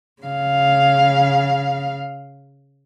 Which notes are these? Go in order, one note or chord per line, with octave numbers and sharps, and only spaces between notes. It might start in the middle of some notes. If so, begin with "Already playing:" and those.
C#3 F5